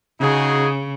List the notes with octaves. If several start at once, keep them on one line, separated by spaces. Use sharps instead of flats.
C#3 D#4 F#4 G#4